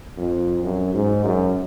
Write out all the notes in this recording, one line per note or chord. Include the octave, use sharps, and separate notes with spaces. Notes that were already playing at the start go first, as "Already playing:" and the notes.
F2
F#2
G#2
F#2